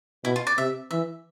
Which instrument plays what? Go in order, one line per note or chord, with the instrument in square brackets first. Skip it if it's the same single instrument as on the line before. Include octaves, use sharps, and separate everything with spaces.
[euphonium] B2 [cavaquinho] E4
[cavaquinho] F4
D5
[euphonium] C3 [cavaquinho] E5
[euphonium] E3 [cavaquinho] E5